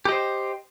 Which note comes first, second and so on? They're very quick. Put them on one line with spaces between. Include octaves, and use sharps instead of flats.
G4 D#5 C5